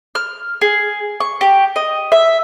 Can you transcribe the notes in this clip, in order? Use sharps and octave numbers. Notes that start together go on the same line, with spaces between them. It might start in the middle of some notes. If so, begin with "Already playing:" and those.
F6
G#4
C#6
G4
D#5
E5